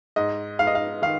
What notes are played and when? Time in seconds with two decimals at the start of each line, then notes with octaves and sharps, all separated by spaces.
0.16 G#2 D#5
0.59 G#2 F5
0.67 D#5
0.75 F5
1.02 D#3 F5